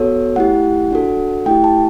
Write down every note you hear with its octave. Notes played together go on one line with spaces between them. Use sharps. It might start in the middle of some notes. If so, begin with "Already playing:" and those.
Already playing: B3 F#4 A4 C#5
A3 E4 G4 F#5
D4 F#4 A4
A3 E4 G4 G5
A5